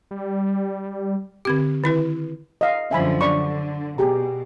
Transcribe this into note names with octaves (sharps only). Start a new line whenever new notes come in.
G3
D3 C4 G4
D#3 E4 B4
D#5 F5
F#2 D3 F3 E5 G#5 B5
D3 D5 B5 C#6
B2 G4 G#4 A#5